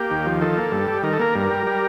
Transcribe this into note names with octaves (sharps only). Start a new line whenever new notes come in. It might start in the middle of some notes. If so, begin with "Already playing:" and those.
Already playing: A#3 G4
D#2
F3
D#3 A4
A#3
G2
G3
D#3 A#4
A4
A#3 A#4
G2
G3
G3